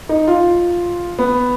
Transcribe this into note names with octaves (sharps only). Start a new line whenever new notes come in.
D#4
F4
B3